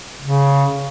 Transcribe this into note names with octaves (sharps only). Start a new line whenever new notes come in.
C#3